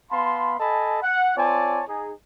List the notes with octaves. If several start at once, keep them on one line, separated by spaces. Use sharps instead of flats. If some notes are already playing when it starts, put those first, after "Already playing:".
B3 F5 A5 B5 C6
A4 D#5 G#5 A5 B5
F#5
C4 F4 C#5 D5 G#5 A5
D#4 G#4